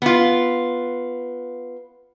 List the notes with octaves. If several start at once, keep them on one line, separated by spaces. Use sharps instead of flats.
B3 F4